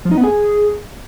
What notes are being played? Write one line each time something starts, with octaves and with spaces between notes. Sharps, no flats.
F3
D#4
B3
G#4